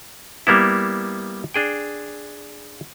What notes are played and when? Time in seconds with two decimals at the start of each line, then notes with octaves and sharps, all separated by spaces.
0.47 G3 A#3 B3 E4
1.54 D4 G#4 G5